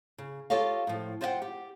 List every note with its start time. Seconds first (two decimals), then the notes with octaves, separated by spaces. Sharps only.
0.18 C#3
0.50 F4 G4 A4 C#5 D#5 F5
0.87 A2 F3
1.21 F4 C5 D#5 E5 F#5 G5
1.42 G4